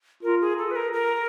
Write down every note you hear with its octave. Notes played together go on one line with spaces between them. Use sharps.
F4 A#4
G#4
A4
B4
A#4
A#4